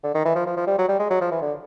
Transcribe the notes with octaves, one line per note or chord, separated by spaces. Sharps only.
D3
D#3
E3
F3
F3
F3
G3
F#3
G3
G#3
F#3
F3
E3
D3